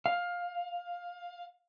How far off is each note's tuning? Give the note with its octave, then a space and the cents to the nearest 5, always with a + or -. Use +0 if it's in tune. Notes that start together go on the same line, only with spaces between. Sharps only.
F5 +15